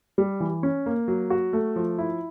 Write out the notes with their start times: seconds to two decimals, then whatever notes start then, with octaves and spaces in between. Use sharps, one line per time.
0.18 G3
0.40 E3
0.63 C#4
0.86 A#3
1.08 F#3
1.30 F#4
1.53 A3
1.76 F3
1.98 E4